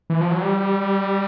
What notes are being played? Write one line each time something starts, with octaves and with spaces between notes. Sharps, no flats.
E3
F3
F#3
G3